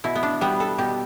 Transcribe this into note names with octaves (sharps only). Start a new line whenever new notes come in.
B2 E4
B3
D4
G3 B3
A4
B2 G4